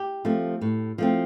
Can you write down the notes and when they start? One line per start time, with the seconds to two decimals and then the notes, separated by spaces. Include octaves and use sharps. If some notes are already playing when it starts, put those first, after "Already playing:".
Already playing: G4
0.25 F3 A3 C4
0.61 A2
0.98 F3 A3 C4